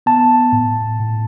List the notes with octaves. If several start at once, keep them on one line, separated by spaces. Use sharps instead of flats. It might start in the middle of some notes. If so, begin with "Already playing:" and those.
B3 A5
A2
A2